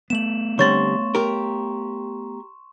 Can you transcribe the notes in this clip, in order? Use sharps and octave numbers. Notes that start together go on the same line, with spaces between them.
A3 B3 E7 F#7
D3 G3 C4 C#5 C6 C#6 A6
G4 A#4